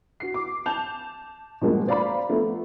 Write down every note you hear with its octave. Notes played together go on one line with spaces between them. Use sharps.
F#4 C7
D6
A5 G6 F7
B2 F3 G3 G#3 A#3 C#4
C5 D5 F5 A#5 B5
F3 A3 B3